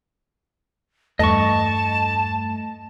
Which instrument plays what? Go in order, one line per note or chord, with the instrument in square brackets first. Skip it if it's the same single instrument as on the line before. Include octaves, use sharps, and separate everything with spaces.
[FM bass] E2 [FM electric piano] G2 A3 [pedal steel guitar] D#5 C#6 [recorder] A5